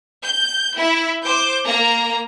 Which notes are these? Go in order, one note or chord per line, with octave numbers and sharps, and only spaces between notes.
G6
E4
C5 D6 G6
A#3 A#5